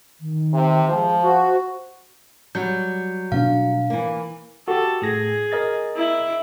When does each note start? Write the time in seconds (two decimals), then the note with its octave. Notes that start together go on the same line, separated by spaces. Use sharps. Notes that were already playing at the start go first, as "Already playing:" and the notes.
0.20 D#3
0.53 C3
0.89 F3 G#3
1.23 F#4 C5
2.55 F#3 G3 G6
3.32 B2 C4 D4 F5
3.90 E3 A#3
4.68 F#4 G4 A4
5.02 A2 G#4 A#6
5.52 A#4 D#5 A6
5.96 E4